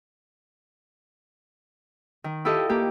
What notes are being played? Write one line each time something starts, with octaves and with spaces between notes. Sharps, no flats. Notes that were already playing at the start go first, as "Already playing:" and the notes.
D#3
E4 F4 G4 A4 D#5
A#3 G4